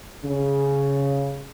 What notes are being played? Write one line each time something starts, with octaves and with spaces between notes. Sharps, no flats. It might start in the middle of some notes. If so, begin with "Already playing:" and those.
C#3